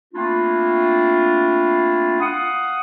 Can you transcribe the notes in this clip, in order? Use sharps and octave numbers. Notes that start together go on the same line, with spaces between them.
A3 A#3 C4 D4 E4 F4
F5 F#5 D#6